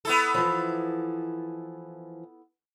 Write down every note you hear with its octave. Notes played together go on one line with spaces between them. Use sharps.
B3 E4 A4
E3 F3